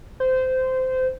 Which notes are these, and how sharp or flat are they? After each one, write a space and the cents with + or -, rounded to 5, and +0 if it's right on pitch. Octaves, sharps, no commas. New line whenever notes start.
C5 -20